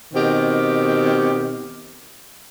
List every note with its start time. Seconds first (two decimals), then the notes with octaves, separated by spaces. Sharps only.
0.14 B2 D#3 C4 G4